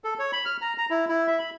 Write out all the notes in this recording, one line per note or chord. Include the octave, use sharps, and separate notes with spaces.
A4
C#5
B5
F6
A#5
A#5
E4
E4
E5
B5